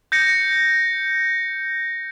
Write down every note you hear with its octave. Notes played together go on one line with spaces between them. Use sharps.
G6 A#6 C#7